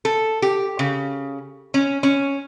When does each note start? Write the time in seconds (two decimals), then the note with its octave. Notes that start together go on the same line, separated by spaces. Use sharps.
0.05 A4
0.42 G4
0.79 C#3
1.74 C#4
2.03 C#4